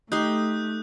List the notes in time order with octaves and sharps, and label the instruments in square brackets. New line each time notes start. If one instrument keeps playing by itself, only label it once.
[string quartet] A3 [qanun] D#4 G4 C6 [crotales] D#6 F#6 G6